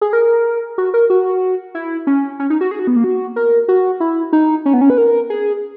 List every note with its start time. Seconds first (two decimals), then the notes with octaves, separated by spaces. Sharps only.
0.01 G#4
0.13 A#4
0.78 F#4
0.94 A#4
1.10 F#4
1.75 E4
2.07 C#4
2.39 C#4
2.50 D#4
2.61 F#4
2.71 G#4
2.79 F#4
2.87 B3
2.96 A#3
3.04 F#4
3.36 A#4
3.68 F#4
4.00 E4
4.33 D#4
4.66 C#4
4.74 B3
4.81 C#4
4.90 B4
4.98 A#4
5.30 G#4